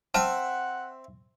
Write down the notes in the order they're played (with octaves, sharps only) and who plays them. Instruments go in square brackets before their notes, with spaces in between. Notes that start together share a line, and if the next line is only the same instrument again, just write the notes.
[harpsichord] C4 E5 [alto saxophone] F#5 [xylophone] A5 F6 E7